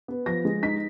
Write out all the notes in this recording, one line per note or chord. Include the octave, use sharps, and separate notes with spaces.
B3
F3 A#6
G#3
D#4 B6